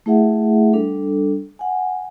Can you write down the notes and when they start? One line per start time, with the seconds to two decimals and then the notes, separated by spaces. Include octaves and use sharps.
0.06 A3 E4 G#4 E5 F#5
0.73 G3 D4 A4
1.59 F#5 G#5